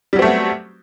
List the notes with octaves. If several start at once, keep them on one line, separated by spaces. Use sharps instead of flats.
F#3 G3 A3 B3 C4